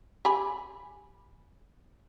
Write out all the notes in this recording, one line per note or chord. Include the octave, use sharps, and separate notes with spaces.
G4 G#5 B5